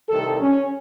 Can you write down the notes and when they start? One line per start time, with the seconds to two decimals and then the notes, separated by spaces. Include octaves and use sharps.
0.09 C2 C3 D#3 A3 A4
0.40 C#4